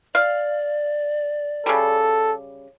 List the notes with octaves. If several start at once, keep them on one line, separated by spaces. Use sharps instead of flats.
D5 F5
C#3 G3 A4